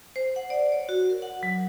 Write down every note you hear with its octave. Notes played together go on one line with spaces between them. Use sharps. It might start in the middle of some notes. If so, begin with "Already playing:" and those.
C5
F#5
D5
C#5
F#4
A#4
F#5
F#3